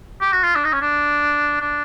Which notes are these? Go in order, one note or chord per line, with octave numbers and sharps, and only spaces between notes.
G4
F#4
F4
D4
D#4
C#4
D4
D4